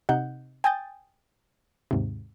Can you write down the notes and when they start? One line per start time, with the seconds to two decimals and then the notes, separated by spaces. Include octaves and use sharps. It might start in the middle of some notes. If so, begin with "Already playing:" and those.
0.09 C3 D#4 F#5 G6
0.64 G5 G#5 D#6 G6 A6
1.91 D#2 G#2 C3